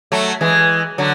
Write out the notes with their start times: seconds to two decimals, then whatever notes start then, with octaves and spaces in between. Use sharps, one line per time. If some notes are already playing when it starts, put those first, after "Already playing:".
0.12 F#3 A3
0.41 E3 G#3
0.98 D3 F#3